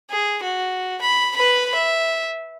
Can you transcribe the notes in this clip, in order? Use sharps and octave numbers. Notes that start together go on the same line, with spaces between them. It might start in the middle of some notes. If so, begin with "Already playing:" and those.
G#4
F#4
B5
B4 B5
E5